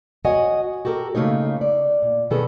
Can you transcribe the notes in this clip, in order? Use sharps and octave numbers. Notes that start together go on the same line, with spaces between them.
F#4 C#5 D#5 F#5 G#5
F#4 G4 A4 A#4
C#3 A3 A#3 D#4 C#5
D5
A#2
B2 D#3 B3 G#4 A4